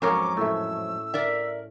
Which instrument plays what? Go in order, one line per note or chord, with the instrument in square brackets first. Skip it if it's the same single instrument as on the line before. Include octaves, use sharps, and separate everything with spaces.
[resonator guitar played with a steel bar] F2 G#2 F#3 [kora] C#4 A#4 C#5 [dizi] D6
[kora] A2 A3 [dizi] E6
[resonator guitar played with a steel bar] A#4 D5 E5